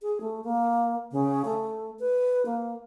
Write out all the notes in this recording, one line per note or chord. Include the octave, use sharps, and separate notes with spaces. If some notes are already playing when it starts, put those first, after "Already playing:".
G#4
A3
A#3
C#3
A3
B4
A#3